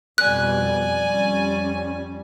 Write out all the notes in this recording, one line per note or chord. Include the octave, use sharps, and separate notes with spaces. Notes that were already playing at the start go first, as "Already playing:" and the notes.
F2 B2 G3 D5 G#5 F#6
F2 G3 C#4